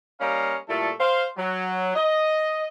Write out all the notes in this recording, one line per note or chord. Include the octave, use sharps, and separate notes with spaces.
G3 A#3 C#4 D#5 F5 A#5
A#2 G3 A3 E4 A4
C5 F5
F#3
D#5